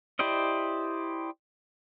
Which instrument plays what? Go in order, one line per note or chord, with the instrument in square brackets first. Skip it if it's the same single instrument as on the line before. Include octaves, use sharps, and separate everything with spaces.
[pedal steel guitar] E4 G4 C5 D5 D#5